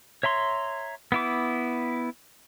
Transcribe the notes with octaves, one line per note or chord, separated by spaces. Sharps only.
C#5 E5 A#5 C6
B3 E4 D6